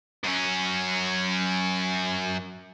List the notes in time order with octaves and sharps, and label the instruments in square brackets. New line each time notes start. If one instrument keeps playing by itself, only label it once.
[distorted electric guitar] F#2 C#4